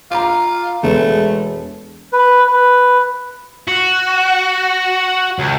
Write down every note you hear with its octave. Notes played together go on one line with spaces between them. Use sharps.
F4 A#5 D6
E1 G#3 A3 B3
B4
B4
F#4
C#2